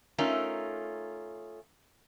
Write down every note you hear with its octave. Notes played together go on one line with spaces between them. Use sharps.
A3 C#4 D#4 F4 A#4